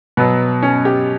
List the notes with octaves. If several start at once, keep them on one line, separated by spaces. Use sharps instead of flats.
B2 F#3 B3
C#4
G4